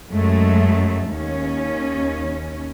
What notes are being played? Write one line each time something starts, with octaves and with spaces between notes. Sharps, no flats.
F#2 G#3 A3
D#2 C#4